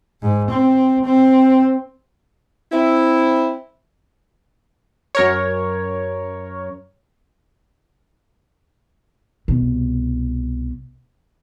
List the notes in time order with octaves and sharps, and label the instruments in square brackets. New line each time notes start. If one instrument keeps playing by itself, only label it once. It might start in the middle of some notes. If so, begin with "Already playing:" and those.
[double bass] G#2
C4
C4
[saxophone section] C4 E4
[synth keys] F#2 A#4 C#5
[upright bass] C2 B2